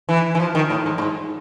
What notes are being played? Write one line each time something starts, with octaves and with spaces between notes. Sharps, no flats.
E3
E3
F3
D#3
A2
G#2
A2
G#2